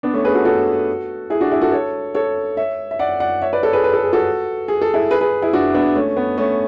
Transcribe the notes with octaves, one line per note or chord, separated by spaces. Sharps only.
B3 D4
A3 C#4
G#4 B4
F#4 A4
F#4 A4
E4 G#4
D4 F#4
E4 G#4
F#4 A4
A4 C#5
A4 C#5
C#5 E5
E5
D5 F#5
D5 F#5
C#5 E5
B4 D5
A4 C#5
G#4 B4
B4
A4
G#4
F#4 A4
G#4
A4
E4 G#4
G#4 B4
G#4 B4
E4 G#4
D4 F#4
B3 D4
A3 C#4
B3
A3 C#4